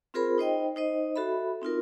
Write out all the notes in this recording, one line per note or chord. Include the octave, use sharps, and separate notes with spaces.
C4 F4 G#4 A#4 C5 B5
D#4 C5 D#5 G5
D#4 C5 D#5
F#4 A4 E5 B5
C4 D#4 F4 A#4